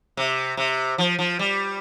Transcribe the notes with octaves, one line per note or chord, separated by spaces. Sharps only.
C3
C3
F3
F3
G3